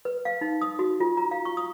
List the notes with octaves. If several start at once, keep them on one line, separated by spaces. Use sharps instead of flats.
B4
F5
D#4
D#6
F#4
F4
A#5
F5
C#6
D#6